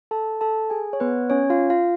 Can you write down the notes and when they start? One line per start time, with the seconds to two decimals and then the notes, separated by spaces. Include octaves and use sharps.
0.11 A4 A5
0.41 A4 A5
0.70 G#4 G#5
0.93 C#5
1.00 B3 B4
1.30 C#4 C#5
1.50 F4 F5
1.70 F4 F5